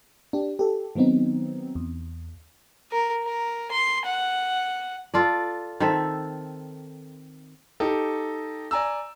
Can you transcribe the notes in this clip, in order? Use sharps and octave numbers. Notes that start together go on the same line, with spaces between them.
D4 G4
G4 A4
D#3 F#3 B3 C4 D#4
E2
A#4
A#4
C6
F#5
F4 A4 D5
D#3 C4 A4 E5
D#4 G4 A4
D5 G#5 A#5 E6